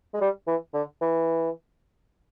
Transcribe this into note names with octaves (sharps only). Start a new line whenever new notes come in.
G#3
G3
E3
D3
E3